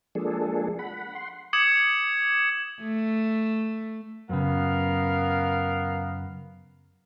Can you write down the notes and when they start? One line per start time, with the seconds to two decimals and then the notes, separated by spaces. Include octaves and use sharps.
0.15 F3 G#3 A#3 D4 G#4 A4
0.79 F#5 B5
1.15 F#5 C6
1.53 D6 D#6 G#6 C#7 E7 F#7
2.82 A3
4.29 F#2 C#3 B3 A#4 F5